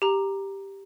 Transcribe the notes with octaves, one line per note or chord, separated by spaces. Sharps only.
G4 A#5